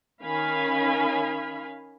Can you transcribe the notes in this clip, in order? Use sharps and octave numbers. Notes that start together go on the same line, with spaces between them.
D#3 C#4 F5 G#5 B5